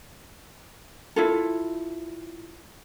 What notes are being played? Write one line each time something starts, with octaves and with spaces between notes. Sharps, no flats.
E4 F4 A4